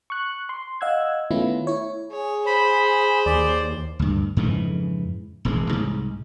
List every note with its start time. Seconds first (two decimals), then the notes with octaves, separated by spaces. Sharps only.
0.10 C#6 F#6
0.49 C6
0.81 D#5 F5 F#5 E6 F#6 G#6
1.31 D#3 A3 B3 C#4 E4 F4
1.67 E4 C#5
2.12 G#4 C#5
2.46 C5 B5
3.26 D#2 D5
3.99 D2 G2
4.37 F2 G#2 C#3 E3
5.45 E1 A1 E3 G#3
5.70 C2 G#2